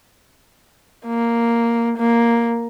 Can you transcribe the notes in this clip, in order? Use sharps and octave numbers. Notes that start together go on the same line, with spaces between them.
A#3
A#3